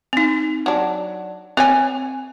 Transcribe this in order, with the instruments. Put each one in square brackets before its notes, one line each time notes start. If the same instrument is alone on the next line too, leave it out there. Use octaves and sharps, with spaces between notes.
[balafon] C4 D#4
[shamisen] F#3 D4
[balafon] C4 [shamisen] B4 C#5 G#5